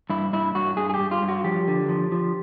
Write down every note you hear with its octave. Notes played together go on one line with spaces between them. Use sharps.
G2 E4
G2 E4
G2 F#4
G2 G#4
G#4
G4
G2
F4
G2
F#4
F3 G4
D3
F3
F3